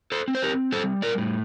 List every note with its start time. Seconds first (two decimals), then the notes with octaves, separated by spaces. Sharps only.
0.12 A4 C5
0.28 C4
0.35 C5
0.43 G4 A#4
0.72 G3 A4 C5
1.02 A#4 D5
1.18 A2